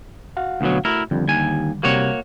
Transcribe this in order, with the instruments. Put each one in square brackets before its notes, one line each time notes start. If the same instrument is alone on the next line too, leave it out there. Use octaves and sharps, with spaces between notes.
[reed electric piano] F#4 F5 F#5
[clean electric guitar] D2 B2 F#3
[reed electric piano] A3 F#4 [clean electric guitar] E4 A#4
[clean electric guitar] F2 [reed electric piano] D3 D#3 G3
[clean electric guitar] D#2 G#5
[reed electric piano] C3 G3 [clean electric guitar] A#3 F#4 C#5